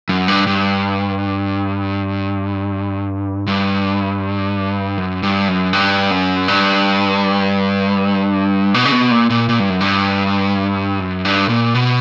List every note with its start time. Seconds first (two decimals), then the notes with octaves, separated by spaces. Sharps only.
0.09 F#2
0.28 G2
0.47 G2
3.47 G2
4.97 F#2
5.23 G2
5.48 F#2
5.73 G2
6.11 F#2
6.48 G2
8.74 B2
8.85 C#3
8.92 B2
9.11 A#2
9.30 A#2
9.49 A#2
9.60 G2
9.70 F#2
9.81 G2
11.00 F#2
11.25 G2
11.49 A#2
11.75 B2